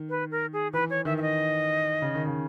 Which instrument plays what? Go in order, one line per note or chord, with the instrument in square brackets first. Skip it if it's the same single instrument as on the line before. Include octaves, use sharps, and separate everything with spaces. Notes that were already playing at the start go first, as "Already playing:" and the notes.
Already playing: [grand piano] D#3
[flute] B4
A#4
G#4
[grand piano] E3 [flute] B4
[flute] C#5
[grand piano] D#3 [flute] E5
[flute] E5
D#5
[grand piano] C#3
D#3
C#3